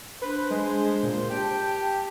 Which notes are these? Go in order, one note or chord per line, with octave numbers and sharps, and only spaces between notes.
D4 B4 C5
G#3
A#2
G4 G5 A5